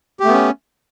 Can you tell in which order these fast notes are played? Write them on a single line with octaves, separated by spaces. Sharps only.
G4 A3 B3 C#4